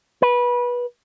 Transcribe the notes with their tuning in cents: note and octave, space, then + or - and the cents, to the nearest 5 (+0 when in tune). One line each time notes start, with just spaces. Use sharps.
B4 -20